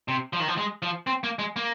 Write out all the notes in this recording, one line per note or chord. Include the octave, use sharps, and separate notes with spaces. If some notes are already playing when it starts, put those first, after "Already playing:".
C3
F3
D#3
F3
G#3
F3
C4
A#3
G#3
A#3